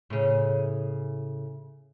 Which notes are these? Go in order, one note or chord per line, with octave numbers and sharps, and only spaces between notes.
A2 C#3